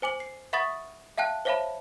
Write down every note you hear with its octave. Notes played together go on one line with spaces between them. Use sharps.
C5 G#5 D6 F#7
C7
E5 F#5 B5 C#6 D#6 A6
E5 F5 G5 A5 F#6
C5 C#5 E5 F5 A5 B5